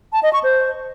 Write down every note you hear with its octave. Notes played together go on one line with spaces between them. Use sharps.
A5
D#5
C#6
C5